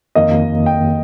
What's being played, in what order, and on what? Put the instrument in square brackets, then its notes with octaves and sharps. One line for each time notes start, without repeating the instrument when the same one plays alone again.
[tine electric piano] F2 D#3 A#3 [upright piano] D#5
[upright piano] G5